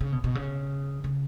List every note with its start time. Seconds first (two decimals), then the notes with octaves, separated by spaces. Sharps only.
0.01 C#3
0.13 B2
0.24 B2
0.35 C#3
1.04 C#3